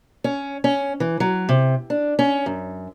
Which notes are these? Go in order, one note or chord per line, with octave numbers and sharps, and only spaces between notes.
C#4
C#4
E3
F#3
C3
D4
C#4
F#2